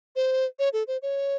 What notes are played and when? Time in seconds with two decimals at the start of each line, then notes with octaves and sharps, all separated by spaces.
0.16 C5
0.59 C#5
0.73 A4
0.87 C5
1.02 C#5